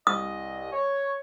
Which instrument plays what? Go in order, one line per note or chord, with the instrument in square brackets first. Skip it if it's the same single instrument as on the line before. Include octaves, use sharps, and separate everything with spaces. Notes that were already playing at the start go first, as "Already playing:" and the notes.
[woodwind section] C2 D#5 [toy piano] D#6
[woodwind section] C#5